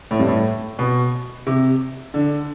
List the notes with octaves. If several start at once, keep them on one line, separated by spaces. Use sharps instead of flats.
A2
G2
A2
B2
C3
D3